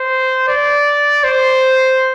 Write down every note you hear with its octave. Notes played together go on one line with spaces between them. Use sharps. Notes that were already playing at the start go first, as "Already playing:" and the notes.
Already playing: C5
D5
C5